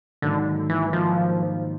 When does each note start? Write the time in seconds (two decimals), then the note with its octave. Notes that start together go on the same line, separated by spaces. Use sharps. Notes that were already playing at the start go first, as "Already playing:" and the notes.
0.22 G#2 D3 D#3 F#3 A#3 D#4
0.70 E3
0.93 G#2 D#3 F3 F#3 A#3 D#4